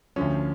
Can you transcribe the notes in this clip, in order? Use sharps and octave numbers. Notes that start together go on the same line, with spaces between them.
D2 D3 F3 C#4